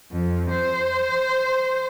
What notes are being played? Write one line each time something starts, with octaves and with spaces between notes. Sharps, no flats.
F2
C5